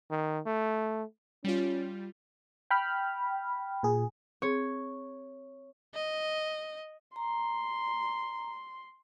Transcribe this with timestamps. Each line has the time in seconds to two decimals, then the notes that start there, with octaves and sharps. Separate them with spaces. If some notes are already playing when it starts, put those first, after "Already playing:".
0.10 D#3
0.46 A3
1.44 G3 C#4 F4
2.70 G5 B5 F6
3.83 A#2 G#4
4.42 C4 G#4 C#5
5.94 D#5
7.16 A#5 C6